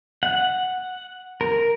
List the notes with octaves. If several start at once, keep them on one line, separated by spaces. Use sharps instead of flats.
F#5
A#4